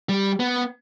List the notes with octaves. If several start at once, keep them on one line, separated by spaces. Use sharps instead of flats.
G3
B3